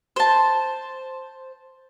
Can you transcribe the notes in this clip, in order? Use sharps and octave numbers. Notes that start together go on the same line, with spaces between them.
C5 A5